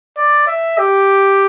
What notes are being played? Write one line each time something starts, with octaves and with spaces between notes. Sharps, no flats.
D5
E5
G4